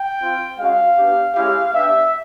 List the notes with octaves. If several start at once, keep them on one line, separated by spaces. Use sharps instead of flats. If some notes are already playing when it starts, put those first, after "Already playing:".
Already playing: G5
C4 F4
G#3 C#4 F#4 F5
B3 D4 G4
G#3 C#4 E4 G4 F5
B3 D4 G4 E5